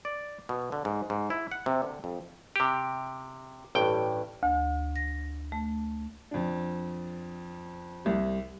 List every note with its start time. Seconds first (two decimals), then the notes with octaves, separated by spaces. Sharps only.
0.05 D5
0.49 B2
0.72 D3
0.85 G#2
1.10 G#2
1.30 E4
1.51 F#5
1.66 C3
1.82 D3
2.04 F2
2.56 C3 G4
3.75 A1 G2 G5
4.43 D2
4.96 A#6
5.52 A3
6.31 F2 D4
8.05 C2 G3